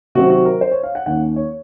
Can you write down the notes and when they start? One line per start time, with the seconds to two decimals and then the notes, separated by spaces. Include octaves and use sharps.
0.15 C3 D#3 F#3 C4 F#4
0.30 F#4
0.45 A#4
0.61 C5
0.71 C#5
0.83 F5
0.95 F#5
1.06 D#2 D#3 A#3 C#4 F#5
1.36 C#5